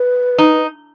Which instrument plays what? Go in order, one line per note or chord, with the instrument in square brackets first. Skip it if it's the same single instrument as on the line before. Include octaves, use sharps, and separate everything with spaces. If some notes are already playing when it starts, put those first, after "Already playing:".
Already playing: [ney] B4
[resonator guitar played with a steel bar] D#4